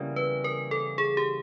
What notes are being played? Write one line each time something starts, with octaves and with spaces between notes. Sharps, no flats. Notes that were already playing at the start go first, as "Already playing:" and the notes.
Already playing: E2 C#3 E3 G3 A#3
B4
A#4
A4
G#4
G4